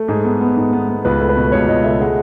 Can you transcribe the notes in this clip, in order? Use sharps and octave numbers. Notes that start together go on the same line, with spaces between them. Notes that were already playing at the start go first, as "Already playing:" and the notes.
Already playing: A3
G#2 G#4
B3
B3
G#2
B3
B3
C#2 B4
A3
B4
B2
C#2 C#5
C#2 D#5
A3 E5
G#3 F#5